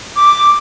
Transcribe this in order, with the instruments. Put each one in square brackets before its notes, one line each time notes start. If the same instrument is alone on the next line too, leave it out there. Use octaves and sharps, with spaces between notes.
[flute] D6